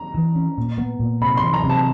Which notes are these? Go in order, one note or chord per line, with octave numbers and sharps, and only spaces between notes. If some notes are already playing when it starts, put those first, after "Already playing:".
Already playing: A#5
E3
C#4
A#2
B3
A#2
C3 B5
E3 C6
A#5
C3
A5